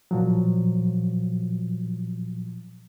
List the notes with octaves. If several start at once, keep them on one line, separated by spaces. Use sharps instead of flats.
A#2 F3 F#3